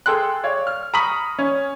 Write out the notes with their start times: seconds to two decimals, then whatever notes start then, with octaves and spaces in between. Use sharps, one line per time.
0.06 G#4 A4 G5 C6 F#6
0.44 C#5 D5 F5
0.67 F6
0.94 A#5 B5 C#6 D#6 B6 F#7
1.38 C#4